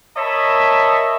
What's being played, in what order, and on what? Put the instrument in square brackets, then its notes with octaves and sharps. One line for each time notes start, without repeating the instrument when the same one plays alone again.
[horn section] A#4 C#5 D#5 E5 A5 B5